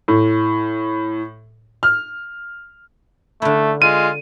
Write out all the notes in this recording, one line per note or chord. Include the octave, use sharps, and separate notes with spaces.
A2
F6
D3 A3 E4
G#3 F4 D#7